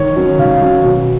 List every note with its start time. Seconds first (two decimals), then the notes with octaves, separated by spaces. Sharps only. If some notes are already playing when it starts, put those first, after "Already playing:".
Already playing: D#3 C#5
0.16 F#3 C#4
0.39 D#3 F5
0.62 F#3 C#4
0.84 B2